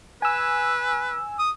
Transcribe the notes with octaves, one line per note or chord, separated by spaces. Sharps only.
B4 G#5 E6
D#6